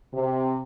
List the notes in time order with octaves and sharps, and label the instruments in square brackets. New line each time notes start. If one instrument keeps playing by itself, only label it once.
[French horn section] C3